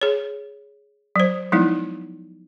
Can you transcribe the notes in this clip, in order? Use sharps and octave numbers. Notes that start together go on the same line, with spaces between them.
G#4 C#5
F#3 C5
F3 F#3 G#3 B3 D#4 E4